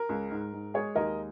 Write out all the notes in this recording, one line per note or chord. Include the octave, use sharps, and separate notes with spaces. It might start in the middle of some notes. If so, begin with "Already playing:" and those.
Already playing: A#4
C#2
G#2
G#2
G#3 G#4 C#5
D#2 A#4 D#5